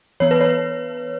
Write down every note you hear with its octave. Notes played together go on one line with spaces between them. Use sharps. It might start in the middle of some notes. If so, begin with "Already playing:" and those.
E3 B3 C#5
B4
C#5